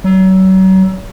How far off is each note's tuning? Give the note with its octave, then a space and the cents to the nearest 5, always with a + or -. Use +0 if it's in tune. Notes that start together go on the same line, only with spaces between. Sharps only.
F#3 +35